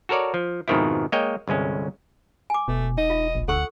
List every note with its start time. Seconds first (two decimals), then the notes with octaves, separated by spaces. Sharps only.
0.09 F#4 A4 A#4 C#5 D5
0.34 F3
0.68 F2 G#2 B2 D#3 F3 E4
1.12 G#3 A#3 C#5 D#5 G5
1.48 G1 C2 G#3 C#4
2.50 G#5 D6
2.68 E1 B2 A3
2.98 D#4 D#5
3.10 F4 E5
3.35 A#1
3.48 D2 A4 F#5 C#6 E6